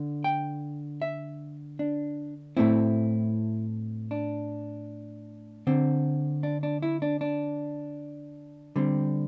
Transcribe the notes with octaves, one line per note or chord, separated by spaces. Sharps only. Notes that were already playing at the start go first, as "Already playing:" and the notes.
Already playing: D3
G5
E5
D4
A2 A3 C4 E4
D4
D3 C4
D4
D4
E4
D4
D4
D3 G3 C4